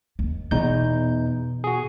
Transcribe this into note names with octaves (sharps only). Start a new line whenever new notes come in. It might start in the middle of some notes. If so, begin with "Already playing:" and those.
D#2
E2 B2 D#4 G6
F#4 G#4